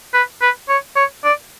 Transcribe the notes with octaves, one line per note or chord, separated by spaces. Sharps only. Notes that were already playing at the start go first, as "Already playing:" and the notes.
B4
B4
C#5
C#5
D5